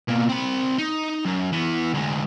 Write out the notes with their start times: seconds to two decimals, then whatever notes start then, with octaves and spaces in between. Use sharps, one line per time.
0.08 B2 A#3
0.29 C4 B5
0.78 D#4
1.25 F#2
1.52 E3 B3
1.93 D2 G#3